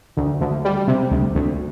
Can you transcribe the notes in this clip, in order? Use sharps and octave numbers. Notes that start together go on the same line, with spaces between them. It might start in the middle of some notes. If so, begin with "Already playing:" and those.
D2
D2
G3
C3
D2
D2